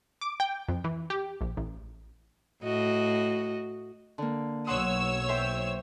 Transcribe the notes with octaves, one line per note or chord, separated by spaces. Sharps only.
D6
G5
F2
E3
G4
A#1
A1
A2 F#4 D#5
D3 A#3
B1 C#5 F#5 C6 D#6 E6
C5 E5 G5